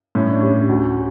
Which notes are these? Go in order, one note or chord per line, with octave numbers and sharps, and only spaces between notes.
A2 C#4
D4
G3 C#4
D2